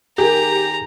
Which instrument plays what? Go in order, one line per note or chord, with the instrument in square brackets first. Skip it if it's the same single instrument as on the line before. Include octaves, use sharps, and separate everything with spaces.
[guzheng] D#3 [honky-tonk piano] G4 [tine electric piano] G#4 G#5 [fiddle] A#5